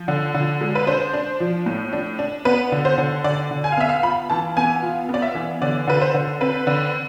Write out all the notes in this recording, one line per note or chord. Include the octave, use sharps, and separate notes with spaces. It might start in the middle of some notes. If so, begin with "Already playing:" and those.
Already playing: F3
D3
D3
G#3
B4
D4 C5
D4
F3
A2
D4
D4
B3 B4
D3
C5
D3
D3 D5
D3
G#5
F5
B3 E5
F5
F4 B5
E3 A5
B3 G#5
F4
B3
D5
E5
E3
D3 D5
D3 B4
C5
D3
C4 B4
D3